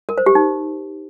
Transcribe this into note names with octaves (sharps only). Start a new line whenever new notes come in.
A#4
C5
G4
D#4